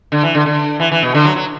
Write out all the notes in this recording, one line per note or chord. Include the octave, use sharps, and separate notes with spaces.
D3
E3
D3
D3
E3
E3
B2
D3
F#3
F#3